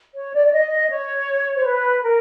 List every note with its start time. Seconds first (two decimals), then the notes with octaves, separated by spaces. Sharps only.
0.16 C#5
0.34 D5
0.47 D5
0.52 D#5
0.89 C#5
1.57 C5
1.64 B4
2.02 A#4